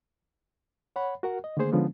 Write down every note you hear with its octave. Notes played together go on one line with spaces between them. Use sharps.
C#5 F#5 B5
F#4 A#4 F#5
D#5
D3 D#3 A3 A#3 G#4 C5
D3 F3 G#3 B3 C#4 D4